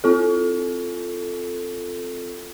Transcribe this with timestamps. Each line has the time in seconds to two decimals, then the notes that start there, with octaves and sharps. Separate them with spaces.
0.04 C4 F4 A4